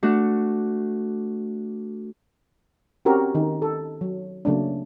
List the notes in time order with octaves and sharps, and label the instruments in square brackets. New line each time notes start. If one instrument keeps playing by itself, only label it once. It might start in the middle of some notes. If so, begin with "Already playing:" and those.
[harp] A3 D4 F#4
[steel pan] C4 C#4 F#4 G4 A#4
D#3 D#4
A4
F#3
C#3 F#3 A3 A#3 C#4 D4